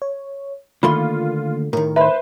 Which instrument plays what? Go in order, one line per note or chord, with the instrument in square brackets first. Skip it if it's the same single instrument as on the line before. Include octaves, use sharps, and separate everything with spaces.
[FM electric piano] C#5
[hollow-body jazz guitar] D3 A3 C6 [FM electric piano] D#3 A#3 [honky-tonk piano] F4 [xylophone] B5
[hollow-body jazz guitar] A2 D#3 [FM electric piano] A#4
[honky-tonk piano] B4 C5 [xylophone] E5 B5